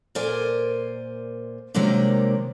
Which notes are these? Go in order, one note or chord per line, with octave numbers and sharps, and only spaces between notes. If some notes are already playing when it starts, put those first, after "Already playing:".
A#2 A#4 C5 D5 G#5
C3 D#3 F#3 G#3 A#3 D4